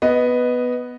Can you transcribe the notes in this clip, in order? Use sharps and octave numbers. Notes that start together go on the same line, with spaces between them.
B3 D#5